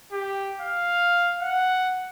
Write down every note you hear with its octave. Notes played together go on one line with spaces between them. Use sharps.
G4
F5
F#5